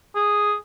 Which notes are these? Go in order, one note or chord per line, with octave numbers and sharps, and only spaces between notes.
G#4